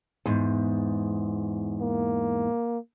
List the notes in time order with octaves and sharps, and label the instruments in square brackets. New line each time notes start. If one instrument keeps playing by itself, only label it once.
[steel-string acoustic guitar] E2 G#2
[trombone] A#3